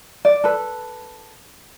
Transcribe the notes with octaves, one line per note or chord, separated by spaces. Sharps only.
D5
A4 B4